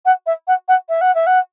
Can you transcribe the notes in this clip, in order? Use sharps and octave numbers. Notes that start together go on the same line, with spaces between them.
F#5
E5
F#5
F#5
E5
F#5
E5
F#5